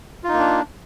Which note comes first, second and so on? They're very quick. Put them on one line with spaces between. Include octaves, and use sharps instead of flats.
F4 D#4 A#3 D4